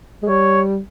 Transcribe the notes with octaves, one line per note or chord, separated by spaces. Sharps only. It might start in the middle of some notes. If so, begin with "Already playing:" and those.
G#3
G3 C#5